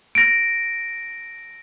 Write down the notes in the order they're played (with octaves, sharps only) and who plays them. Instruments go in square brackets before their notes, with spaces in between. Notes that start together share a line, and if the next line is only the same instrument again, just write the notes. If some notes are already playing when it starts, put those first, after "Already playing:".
[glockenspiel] A#6 D7